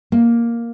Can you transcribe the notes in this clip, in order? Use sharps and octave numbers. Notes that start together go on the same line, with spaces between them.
A#3